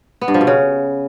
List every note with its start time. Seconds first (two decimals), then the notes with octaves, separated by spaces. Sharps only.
0.21 B3
0.28 G2
0.34 F3
0.41 B2
0.47 C#3